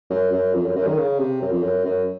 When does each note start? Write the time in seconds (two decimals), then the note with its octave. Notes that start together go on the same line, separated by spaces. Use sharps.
0.10 F#2
0.32 F#2
0.54 F2
0.64 F#2
0.76 F#2
0.86 D#3
0.97 C#3
1.19 C3
1.41 F#2
1.51 F2
1.62 F#2
1.85 F#2